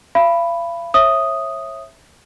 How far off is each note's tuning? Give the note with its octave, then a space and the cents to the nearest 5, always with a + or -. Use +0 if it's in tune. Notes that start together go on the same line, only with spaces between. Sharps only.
F5 -40 B5 +0
C#5 -30 E5 +0 D#6 +0